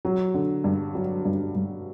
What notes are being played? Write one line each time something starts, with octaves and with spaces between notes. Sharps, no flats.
F#3
D3
G2
F#3
G2
G2